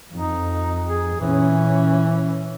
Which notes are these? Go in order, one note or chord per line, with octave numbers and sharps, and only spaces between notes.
F2 D#4
G#4
A#2 E3 C#4